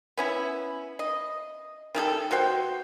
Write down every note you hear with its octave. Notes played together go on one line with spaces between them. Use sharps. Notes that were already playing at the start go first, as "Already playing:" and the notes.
B3 C#4 E4
D#5
D#3 G3 G#4 A4
B2 F#4 C5 G5